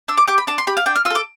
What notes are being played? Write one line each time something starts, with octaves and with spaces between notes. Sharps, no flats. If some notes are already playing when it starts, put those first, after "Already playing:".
D4 E6
D6
G4 D6
B5
D4 A5
C6
G4 B5
F5
D4 G5
F6
F4 E6
A4 D6